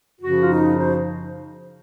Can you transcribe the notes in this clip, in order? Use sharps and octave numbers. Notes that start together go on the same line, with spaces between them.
F#2 C#3 F3 F#4
F4
D#4
C5